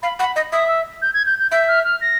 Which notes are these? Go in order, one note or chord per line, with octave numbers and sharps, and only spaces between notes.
F5 B5
F#5 B5
D#5
E5 D#6
E6
G6
G#6
G6
G6
E5 G6
F6
F6
A#6